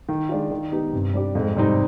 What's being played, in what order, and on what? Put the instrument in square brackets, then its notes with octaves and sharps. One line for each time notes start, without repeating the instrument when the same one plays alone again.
[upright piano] D#3
G#3 D4 F4
D#3
B3 D#4 G4
[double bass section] G2 [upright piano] C3
[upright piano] G3 D4 G4
[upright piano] F2 [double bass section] G#2
[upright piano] C3 G3 C4 D#4